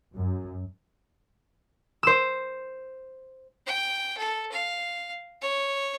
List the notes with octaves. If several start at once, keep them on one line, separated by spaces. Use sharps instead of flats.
F#2
C5 E6
G5
A4
F5
C#5